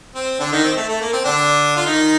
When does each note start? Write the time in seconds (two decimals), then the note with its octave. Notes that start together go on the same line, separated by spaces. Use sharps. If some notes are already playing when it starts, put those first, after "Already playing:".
0.15 C4
0.40 D3 D4
0.52 D#3 D#4
0.64 C4
0.77 A3
0.89 A3
1.01 A#3
1.13 C4
1.25 D3 D4
1.77 F4
1.86 D#3 D#4